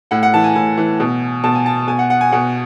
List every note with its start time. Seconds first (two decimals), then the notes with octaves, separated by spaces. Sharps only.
0.11 A2 F#5
0.23 F#5
0.34 E3 A5
0.44 G#5
0.55 A2 G#5
0.78 E3
1.00 B2
1.44 B2 A5
1.55 G#5
1.66 A5
1.88 B2 G#5
1.99 F#5
2.10 F#5
2.21 G#5
2.32 B2 F#5